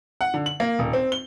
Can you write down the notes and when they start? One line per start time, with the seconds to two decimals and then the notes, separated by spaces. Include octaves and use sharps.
0.21 F#5
0.34 D3
0.46 F#7
0.60 A#3
0.79 D#1
0.93 C4
1.12 G7